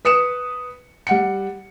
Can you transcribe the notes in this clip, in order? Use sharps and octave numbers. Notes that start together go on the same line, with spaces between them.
B4 D#6 C#7 E7
G3 F#5 C#7